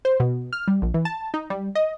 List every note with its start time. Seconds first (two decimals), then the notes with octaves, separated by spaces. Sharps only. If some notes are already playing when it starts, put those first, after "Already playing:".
0.05 C5
0.20 B2
0.53 F6
0.68 G3
0.82 A#1
0.94 E3
1.05 A5
1.34 D#4
1.50 G3
1.75 D#5